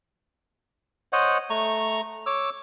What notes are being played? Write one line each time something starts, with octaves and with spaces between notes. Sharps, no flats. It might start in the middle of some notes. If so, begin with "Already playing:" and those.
C5 C#5 D#5 F#5
A3 A#5 C#6
C#5 D6 E6